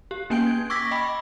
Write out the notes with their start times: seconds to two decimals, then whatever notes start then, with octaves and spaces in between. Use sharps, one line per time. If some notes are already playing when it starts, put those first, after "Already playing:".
0.11 G4
0.30 A#3 C#4 G5 G#5 G6 D7
0.47 G#6
0.70 C#6 D6 E6 G#6 A#6 B6
0.91 D#5 G5 B5